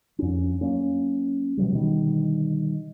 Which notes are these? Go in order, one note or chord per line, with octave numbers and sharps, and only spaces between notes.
F2 C#4
F#3 A#3 C#4
B2 E3 F#3 G3
B2 D3 D#3 G3